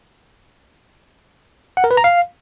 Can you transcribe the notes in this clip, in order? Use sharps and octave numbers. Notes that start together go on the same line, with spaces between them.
F#5
A#4
B4
A#5
F5